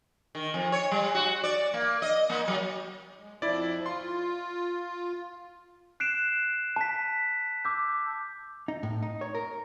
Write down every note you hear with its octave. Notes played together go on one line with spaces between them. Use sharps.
D#3
F2
C#5
G3
F#4
D5
A#3
D#5
A#3
F#3
G#3
F2 F3 E4 D5
F4 C6
F#6 C7 D7 E7
A5 B6
D6 E6 G6
D#4
A2
D#4
C#5
A#4